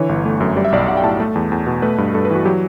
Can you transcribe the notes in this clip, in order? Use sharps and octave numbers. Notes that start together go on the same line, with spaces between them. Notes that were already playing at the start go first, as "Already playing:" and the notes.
Already playing: D3 E3 C#5
G1
A3
F#2
G3 D5
E5
B1 D5
B1 F#5
G5
A2 A5
A3
E2
E2
B2
A3 B4
G2
G2 A4
B4
E3 F#4
F#3 G4